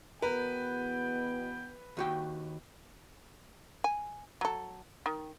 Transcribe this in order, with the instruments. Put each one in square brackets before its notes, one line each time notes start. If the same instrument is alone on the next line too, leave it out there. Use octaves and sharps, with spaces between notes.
[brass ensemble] E2 B2 G5 [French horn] B3 [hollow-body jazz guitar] A#4 [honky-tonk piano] B4
[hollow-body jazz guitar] D#2 F#4 G5
[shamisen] G#5
F#3 A4
D#3